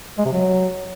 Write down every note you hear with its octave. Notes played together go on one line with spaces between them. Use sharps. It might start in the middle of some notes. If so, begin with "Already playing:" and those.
G#3
C3
F#3